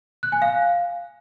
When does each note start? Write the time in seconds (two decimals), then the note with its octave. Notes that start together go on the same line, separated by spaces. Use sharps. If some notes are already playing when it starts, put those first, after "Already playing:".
0.23 F#6
0.32 G#5
0.42 F5